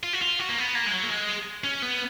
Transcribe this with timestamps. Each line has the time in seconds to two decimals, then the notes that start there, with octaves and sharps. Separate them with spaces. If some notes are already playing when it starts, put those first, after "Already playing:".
0.04 F4
0.13 F#4
0.22 F4
0.39 F#4
0.49 A#3
0.58 B3
0.75 A#3
0.87 G#3
0.93 F#3
1.03 A#3
1.10 G#3
1.64 C#4
1.82 B3